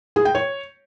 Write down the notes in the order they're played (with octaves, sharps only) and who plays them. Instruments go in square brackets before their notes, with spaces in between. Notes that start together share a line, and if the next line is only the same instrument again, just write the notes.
[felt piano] G#4
G5
C#5